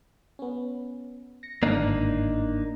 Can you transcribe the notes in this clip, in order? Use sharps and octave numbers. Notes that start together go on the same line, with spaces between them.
B3 C#4
A#6 C#7
G1 G#2 D#3 A#3 D4 D#4